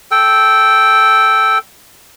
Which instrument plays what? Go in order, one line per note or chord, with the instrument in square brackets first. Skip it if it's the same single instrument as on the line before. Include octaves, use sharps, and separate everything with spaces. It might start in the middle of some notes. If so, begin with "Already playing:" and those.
[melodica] A4 G5